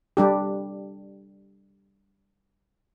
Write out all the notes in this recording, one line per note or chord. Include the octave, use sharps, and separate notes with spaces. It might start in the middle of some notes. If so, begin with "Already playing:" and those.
G3 D4 G4